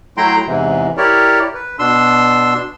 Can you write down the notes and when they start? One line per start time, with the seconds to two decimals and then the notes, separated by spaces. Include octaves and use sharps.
0.17 F#3 A3 E4 G5 A#5 C6
0.47 E2 G#2 C3 E3
0.97 E4 G4 A#4 C#5 D5
1.55 B4
1.79 B2 D4 C6 E6